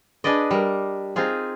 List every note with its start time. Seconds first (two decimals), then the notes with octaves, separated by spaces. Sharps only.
0.24 D4 G#4 B4 D5 D#5
0.51 G3 A#4
1.16 C4 D#4 F4 G#4